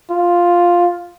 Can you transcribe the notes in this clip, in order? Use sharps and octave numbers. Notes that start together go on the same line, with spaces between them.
F4